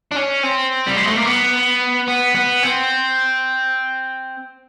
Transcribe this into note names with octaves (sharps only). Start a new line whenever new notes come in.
D4
C#4
C4
G3
G#3
A3
A#3
B3
B3
B3
C4